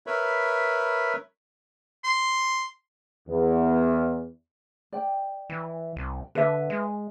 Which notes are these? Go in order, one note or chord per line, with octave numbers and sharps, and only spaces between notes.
A#4 B4 C#5 E5 B5
C6
E2
D5 G5
E3
C2
D3 B4 E5
G#3